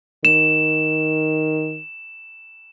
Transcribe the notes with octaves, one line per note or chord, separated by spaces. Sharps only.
D#3 E7